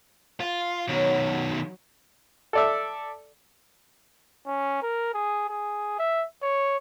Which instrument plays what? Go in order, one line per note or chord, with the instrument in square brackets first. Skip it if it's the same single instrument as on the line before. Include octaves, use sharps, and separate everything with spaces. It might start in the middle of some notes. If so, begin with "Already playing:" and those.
[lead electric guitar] F4
[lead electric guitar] B2 D#3 [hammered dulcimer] F#3
[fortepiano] A4 D5 E5
[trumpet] C#4
A#4
G#4
G#4
E5
C#5